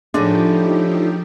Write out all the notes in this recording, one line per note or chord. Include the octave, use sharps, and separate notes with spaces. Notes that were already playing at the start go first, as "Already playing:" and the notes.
A2 D3 F3 G#3 D4 D#4 G4